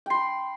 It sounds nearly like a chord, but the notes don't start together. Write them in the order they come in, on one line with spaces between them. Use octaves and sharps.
G5 C6 B5